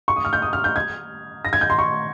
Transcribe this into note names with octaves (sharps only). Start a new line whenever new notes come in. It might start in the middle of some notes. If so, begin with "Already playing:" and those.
C#6
D#6
F6
G6
D#6
F6
G6
G#6
A#6
G#6
G6
C6
C#6